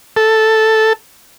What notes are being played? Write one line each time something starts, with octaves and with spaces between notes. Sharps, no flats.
A4